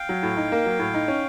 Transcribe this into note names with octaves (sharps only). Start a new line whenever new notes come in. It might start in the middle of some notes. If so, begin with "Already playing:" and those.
Already playing: F5 G5
F#3
A2
D#4
A#3
F#3
A2
D#4
C#4